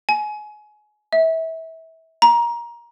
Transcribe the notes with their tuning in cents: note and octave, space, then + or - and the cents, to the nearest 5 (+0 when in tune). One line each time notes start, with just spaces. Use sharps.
G#5 +25
E5 -25
A#5 +20